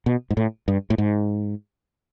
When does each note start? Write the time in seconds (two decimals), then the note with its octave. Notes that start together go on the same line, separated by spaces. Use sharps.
0.06 B2
0.30 G#2
0.37 A2
0.68 G2
0.90 A2
0.98 G#2